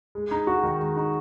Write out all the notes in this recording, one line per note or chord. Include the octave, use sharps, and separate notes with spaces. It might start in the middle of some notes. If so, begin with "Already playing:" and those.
G#3
D#4
F#4
D#3
G#3
D#4